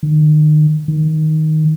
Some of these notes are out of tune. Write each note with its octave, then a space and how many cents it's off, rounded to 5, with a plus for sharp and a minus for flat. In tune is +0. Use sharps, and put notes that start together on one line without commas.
D#3 -35
D#3 +5